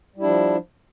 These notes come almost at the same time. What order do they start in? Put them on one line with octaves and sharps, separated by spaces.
G3 E4 D4 F3